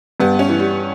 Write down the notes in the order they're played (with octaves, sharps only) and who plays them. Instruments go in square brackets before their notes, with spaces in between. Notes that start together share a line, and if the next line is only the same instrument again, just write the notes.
[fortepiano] G2 [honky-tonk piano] B3
[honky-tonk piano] C#4
[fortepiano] E3
[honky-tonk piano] G3